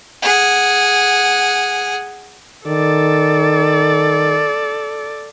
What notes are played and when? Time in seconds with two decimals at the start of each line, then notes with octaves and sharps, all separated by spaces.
0.22 G#4 F#5
2.67 D#3 A4 D5